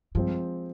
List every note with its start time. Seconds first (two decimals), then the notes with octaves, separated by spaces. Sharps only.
0.15 G2 F3 G#3 C4